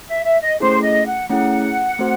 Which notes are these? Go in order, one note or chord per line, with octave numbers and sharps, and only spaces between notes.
E5
E5
D#5
A3 C#4 E4 G#4 C5
D#5
F#5
A3 C#4 E4 G#4 F#5
A3 C4 F#4 C5